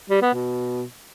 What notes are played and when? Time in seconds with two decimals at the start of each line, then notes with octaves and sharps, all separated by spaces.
0.10 G3
0.22 B3
0.34 B2